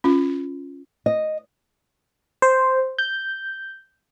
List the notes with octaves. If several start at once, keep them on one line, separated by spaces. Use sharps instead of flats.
C#4 F4
D#5
C5
G6